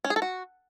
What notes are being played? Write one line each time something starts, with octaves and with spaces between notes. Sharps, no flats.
C#4
G#4
A4
F#4